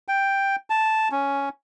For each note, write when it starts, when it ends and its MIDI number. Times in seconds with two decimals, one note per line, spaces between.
0.08 0.56 79
0.70 1.09 81
1.12 1.49 61